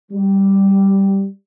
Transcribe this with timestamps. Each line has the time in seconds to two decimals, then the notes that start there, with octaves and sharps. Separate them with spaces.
0.11 G3